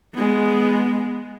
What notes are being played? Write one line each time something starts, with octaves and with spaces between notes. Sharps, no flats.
G#3 B3